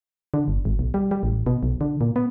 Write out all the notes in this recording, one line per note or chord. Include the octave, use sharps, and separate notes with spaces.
D3
G1
G#1
B1
G3
G3
A1
B2
B1
D3
A#2
B3